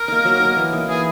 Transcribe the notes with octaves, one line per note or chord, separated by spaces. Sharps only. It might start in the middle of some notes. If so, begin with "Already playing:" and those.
Already playing: A#4
A#3 D#4
F#3
A#3 D#4
E3
A#3 D#4
E3 G#4